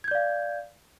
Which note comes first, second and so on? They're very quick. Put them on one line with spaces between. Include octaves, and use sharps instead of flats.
G#6 G6 D5 F5